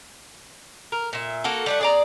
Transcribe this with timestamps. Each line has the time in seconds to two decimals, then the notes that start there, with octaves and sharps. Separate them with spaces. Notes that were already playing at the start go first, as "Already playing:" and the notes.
0.92 A#4
1.13 A#2 E5
1.44 A#3 F#4 A4
1.66 G3 A3 F#5
1.81 G#4 D5 A#5